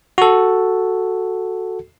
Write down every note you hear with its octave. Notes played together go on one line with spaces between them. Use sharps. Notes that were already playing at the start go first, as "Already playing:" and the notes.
F#4 A4